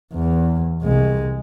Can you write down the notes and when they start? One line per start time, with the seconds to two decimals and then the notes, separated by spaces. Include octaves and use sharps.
0.14 E2
0.82 C2 G#3